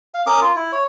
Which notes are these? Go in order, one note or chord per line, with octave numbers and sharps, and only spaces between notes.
F5
C#4 A#4 D6 D#6
F4
E4
C#5